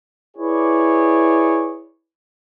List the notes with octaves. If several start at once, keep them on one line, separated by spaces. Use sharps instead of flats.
E4 G#4 B4 C#5 D5